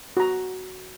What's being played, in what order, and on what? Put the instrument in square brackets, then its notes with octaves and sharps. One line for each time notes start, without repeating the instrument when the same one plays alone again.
[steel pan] F#4 A#5